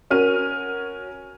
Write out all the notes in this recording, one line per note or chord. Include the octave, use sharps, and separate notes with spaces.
C#4 F#4 A#4 F6 D#7